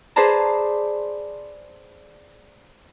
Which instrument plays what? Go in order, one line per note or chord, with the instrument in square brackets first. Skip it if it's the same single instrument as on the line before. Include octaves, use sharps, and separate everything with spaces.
[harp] G#4 B4 C5 D5 A5 A#5